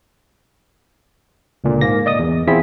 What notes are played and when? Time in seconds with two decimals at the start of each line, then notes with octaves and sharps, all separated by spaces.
1.64 C#2 A#2 D3
1.81 G#2 A#3 A#6
2.06 D5 D#5 D#6
2.19 E2
2.47 E2 C4 E4 F4 G#4 B6